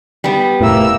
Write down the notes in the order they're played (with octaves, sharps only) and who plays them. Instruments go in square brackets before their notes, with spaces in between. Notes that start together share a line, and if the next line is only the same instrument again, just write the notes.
[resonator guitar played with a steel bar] G3 B3
[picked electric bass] F1 A2 [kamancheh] A#3 E6